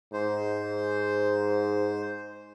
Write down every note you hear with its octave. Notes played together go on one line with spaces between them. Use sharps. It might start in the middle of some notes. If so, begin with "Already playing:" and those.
G#2 C5